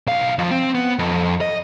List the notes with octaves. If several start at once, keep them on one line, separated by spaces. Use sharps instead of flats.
B1 F5
F2 F3
C4
B3
F2
D#5